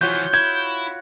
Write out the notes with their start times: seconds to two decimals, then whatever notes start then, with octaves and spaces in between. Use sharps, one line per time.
0.01 E3 F3 F4 F#4 C#5 G6
0.34 E4 G#6